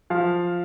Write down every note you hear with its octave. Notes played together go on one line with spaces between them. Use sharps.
F3 F5